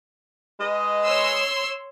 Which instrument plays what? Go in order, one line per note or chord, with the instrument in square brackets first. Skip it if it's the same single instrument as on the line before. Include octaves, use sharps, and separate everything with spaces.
[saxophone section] G#3 B4 D#5
[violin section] C#5 C6 E6